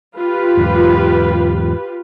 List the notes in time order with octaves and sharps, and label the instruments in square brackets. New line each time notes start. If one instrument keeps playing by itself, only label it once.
[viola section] F4 G4 B4
[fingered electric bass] E2 G#2